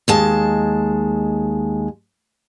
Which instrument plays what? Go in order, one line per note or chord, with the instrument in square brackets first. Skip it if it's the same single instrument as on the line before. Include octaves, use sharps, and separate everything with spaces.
[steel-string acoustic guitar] D#2 G#3 A5